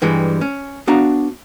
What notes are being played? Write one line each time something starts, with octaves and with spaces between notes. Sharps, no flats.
G2 E3 G3 G#3
C#4
B3 D4 F#4 F5 A#5